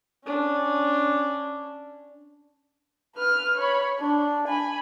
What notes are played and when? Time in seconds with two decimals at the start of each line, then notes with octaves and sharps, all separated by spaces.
0.24 C#4 D4
3.17 B4 F6
3.57 C#5 B5
4.00 D4
4.48 G#5 B5